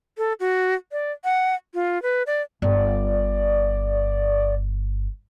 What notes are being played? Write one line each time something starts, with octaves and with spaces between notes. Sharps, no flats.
A4
F#4
D5
F#5
F4
B4
D5
G1 D5